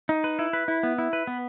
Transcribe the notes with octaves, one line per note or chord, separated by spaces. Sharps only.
D#4
B4
E4
B4
E4
B3
E4
B4
B3